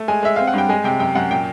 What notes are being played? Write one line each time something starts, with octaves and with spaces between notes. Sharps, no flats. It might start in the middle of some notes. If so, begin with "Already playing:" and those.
Already playing: A3
G#3 G#5
G#3 E5
C4 F5
F#5
G2 G5
G#3 G#5
C3 G5
F#2 G5
F#2 F#5
A#2 G5